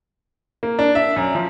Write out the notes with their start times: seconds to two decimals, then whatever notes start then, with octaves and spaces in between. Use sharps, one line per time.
0.63 A#3
0.79 D4
0.95 E5
1.16 F#2
1.35 F3